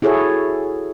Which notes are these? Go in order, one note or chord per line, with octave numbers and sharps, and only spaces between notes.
E4 F#4 G#4 A4 C#5